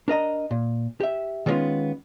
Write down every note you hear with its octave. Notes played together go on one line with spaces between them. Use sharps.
D4 A#4 D#5 A#5
A#2
G4 E5
D#3 G3 G#3 B3 C#4 F4